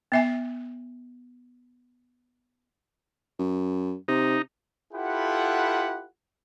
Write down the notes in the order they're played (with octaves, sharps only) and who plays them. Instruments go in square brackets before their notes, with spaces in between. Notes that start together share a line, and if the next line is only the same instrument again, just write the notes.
[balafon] B3 E5 G#5
[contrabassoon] F#2
[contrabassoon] C3 [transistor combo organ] D#4
[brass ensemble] E4 F4 G4 A4 B4 F#5